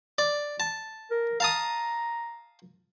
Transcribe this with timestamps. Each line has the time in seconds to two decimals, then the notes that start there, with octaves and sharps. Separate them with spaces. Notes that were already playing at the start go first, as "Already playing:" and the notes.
0.18 D5
0.60 A5
1.11 A#4
1.40 F5 A5 A#5 D#6